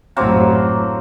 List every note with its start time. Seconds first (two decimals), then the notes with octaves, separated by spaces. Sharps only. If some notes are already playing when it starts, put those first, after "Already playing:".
0.16 A1 F#2 A2 F#3 A#3 C4